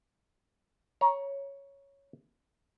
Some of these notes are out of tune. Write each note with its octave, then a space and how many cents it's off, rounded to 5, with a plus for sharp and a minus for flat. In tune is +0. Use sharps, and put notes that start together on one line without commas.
C#5 +0 A#5 +25